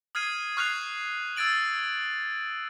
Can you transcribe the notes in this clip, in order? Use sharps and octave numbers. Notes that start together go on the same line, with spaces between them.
D#6 F6 G#6 C7 D#7
C#6 F6 F#6 G#6 C7 F7
E6 G#6 A6 D7 F#7